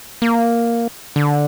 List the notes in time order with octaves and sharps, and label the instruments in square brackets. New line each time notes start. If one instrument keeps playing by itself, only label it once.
[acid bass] A#3
D3